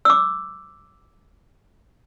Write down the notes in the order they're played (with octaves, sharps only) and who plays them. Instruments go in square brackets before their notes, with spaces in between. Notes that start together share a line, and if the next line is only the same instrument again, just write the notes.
[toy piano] D6 E6